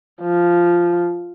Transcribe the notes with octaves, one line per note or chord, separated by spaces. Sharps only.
F3